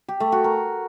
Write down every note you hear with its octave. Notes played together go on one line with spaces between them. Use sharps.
G4
A3
F#4
A#4